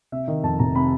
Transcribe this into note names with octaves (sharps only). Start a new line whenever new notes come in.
C3 E5
D#3 D#5
F2 A5
F1 A#5
C3 B5